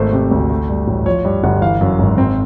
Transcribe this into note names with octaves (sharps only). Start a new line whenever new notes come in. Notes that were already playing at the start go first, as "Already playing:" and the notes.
Already playing: G#1 A3 C5
C3
D2
A3
G2
A1
F3 C#5
G2
G1 F#5
E3 F5
F#2
G#1
C4